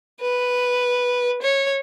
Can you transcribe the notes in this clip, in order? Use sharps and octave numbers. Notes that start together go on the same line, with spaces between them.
B4
C#5